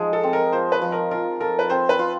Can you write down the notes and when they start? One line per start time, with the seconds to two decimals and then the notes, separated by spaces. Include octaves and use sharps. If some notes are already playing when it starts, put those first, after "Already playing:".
Already playing: F3 G#3 D#4
0.13 A4
0.23 C4
0.33 A#4
0.52 F3 C5
0.72 B4
0.82 F3
0.92 A#4
1.11 F4 A#4
1.40 A4 A#4
1.59 B4
1.70 C4 C5
1.89 B4
1.99 F4